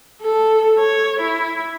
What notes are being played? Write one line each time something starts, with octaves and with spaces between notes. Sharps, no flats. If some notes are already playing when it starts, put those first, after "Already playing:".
A4
C#5
E4